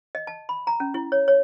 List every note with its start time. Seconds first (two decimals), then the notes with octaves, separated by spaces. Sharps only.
0.15 D#5
0.27 A5
0.49 B5
0.67 A#5
0.80 C#4
0.94 E4
1.12 C#5
1.28 C#5